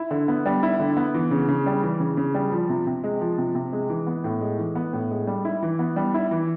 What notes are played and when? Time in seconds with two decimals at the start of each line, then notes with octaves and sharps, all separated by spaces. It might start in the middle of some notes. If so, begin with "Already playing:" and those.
Already playing: E4
0.11 D3
0.28 B3
0.46 G3
0.63 E4
0.79 D3
0.97 B3
1.14 E3
1.31 C#3
1.48 C#3
1.66 G3
1.83 E3
2.00 C#3
2.17 C#3
2.35 G3
2.52 F3
2.69 C3
2.87 C3
3.04 G#3
3.21 F3
3.38 C3
3.55 C3
3.73 G#3
3.90 E3
4.07 B3
4.24 A2
4.41 G#3
4.59 E3
4.75 B3
4.93 A2
5.11 G#3
5.27 G3
5.45 E4
5.63 E3
5.79 B3
5.96 G3
6.14 E4
6.31 E3